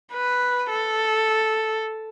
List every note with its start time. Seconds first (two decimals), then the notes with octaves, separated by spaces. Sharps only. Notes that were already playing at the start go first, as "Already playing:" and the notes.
0.12 B4
0.70 A4